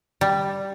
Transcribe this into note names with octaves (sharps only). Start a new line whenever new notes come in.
G3